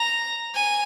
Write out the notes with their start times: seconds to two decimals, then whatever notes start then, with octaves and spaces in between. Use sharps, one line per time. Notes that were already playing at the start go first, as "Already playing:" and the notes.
Already playing: A#5
0.55 G#5